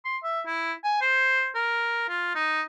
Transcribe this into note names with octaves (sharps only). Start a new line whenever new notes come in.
C6
E5
E4
G#5
C5
A#4
F4
D#4